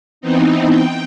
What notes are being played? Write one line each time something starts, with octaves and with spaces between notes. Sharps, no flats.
E3 B3 C4 D#4
G5